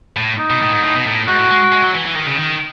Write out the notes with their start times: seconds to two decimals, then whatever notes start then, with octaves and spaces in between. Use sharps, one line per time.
0.17 A2
0.39 D#4
0.50 B2
0.61 A2
0.72 G#2
0.83 A2
0.95 B2
1.06 A2
1.28 G#2 F#4
1.39 A2
1.51 G#3
1.72 G#3
1.83 F#3
1.95 E3
2.06 E3
2.16 D#3
2.26 C#3
2.36 D#3